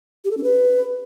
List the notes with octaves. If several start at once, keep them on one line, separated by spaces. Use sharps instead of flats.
G4
A4
C#4
B4